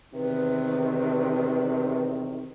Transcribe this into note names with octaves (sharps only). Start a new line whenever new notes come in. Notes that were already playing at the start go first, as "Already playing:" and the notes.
E2 C3 D#3 B4